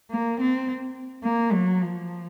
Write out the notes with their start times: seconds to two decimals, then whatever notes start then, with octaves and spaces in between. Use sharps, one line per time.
0.11 A#3
0.40 C4
1.24 A#3
1.52 F#3
1.81 F3